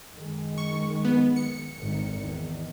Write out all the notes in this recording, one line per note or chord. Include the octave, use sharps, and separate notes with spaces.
F#2 D#3 G#3
C#6
B3
C#7
G#1 G2 D#3
E2 D#3